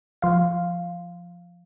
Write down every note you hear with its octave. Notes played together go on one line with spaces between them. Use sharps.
F3 F5